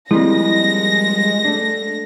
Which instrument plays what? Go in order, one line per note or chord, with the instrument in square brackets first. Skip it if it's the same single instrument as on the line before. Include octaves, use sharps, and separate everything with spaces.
[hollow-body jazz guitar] F3 G3 A#3 [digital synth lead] G#3 [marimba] C4 E4 [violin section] A#6
[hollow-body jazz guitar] A3 D4